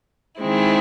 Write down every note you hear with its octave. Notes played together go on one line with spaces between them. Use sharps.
D#3 G#3 C4 E4